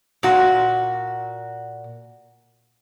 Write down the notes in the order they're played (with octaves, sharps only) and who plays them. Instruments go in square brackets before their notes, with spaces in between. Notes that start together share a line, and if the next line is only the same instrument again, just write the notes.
[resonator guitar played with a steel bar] A#2 F#4